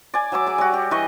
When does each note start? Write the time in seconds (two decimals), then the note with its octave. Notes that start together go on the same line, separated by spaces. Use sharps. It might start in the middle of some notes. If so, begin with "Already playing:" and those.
0.14 D5 G#5
0.32 F#3 E5 G#5 D6
0.46 G#4 D5
0.58 G3 F#4
0.74 G4
0.91 E3 B4 D#5 C#6